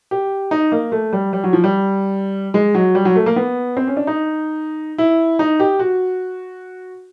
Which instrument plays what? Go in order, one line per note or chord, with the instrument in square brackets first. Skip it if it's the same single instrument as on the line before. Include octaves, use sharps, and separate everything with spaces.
[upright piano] G4
D#4
A#3
A3
G3
G3
F#3
F3
G3
G#3
F#3
G3
F#3
A3
A#3
B3
C4
C#4
D4
D#4
E4
D#4
G4
F#4